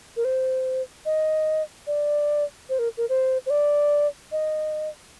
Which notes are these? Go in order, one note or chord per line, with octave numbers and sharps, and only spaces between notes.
A#4
C5
D#5
D5
C5
A#4
A#4
C5
C5
D5
D#5